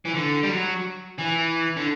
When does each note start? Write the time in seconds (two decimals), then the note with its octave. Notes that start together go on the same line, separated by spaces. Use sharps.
0.05 E3
0.14 D3
0.43 G3
0.49 F#3
1.19 E3
1.76 D3